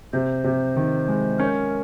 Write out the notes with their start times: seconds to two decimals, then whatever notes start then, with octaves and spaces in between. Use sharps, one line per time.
0.13 C3 C5
0.44 C3
0.76 D#3
1.08 G#3
1.39 C#4 A#4